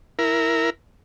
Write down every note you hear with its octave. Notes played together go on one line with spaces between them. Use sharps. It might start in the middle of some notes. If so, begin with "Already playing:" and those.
E4 A#4